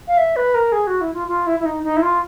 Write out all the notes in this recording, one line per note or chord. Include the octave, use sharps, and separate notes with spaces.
F5
E5
B4
A#4
G#4
F#4
E4
F4
F4
E4
E4
D#4
D#4
E4
F4